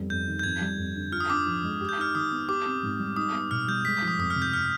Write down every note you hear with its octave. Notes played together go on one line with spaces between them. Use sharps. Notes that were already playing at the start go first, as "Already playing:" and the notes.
Already playing: F2 G3 B3
F2 G6
D#3
G6
F2 G#6
G3
F2
D3
F4 F6
D#6
D4 D6
F3
G#3
G4
G6
D#4 F6
D#3 D#6
B3
G4 D6
C4
G#2
G3
D#4 D#6
B3
B2 F6
G3 G6
G#3 B6
G6
F3
D#6
F2 D#6
F6
C3
G6
F6